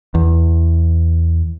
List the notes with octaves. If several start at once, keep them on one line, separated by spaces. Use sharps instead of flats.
E2